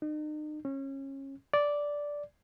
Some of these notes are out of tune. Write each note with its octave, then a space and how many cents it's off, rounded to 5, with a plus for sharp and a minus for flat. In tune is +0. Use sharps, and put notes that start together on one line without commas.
D#4 -40
C#4 -25
D5 -5